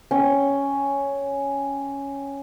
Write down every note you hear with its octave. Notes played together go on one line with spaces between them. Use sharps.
C#4 G5